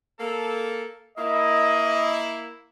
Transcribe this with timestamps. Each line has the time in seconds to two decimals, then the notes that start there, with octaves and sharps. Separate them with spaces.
0.19 A#3 A4
1.18 A#3 E4 D#5